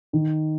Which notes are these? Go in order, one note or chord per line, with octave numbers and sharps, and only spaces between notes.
D#3